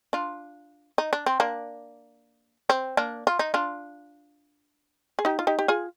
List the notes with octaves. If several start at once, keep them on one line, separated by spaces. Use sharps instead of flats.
D4 F4
D#4
D4
C4
A#3 D4
C4
A#3 D4
F4
D#4
D4 F4
G#4
D#4 G4
F4
D#4 G4
G4
F4 G#4